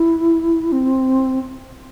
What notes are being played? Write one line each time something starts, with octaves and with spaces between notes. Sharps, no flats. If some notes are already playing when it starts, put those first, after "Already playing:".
Already playing: E4
C4